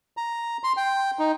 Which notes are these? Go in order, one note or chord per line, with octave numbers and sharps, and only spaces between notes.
A#5
C6
G5
D#4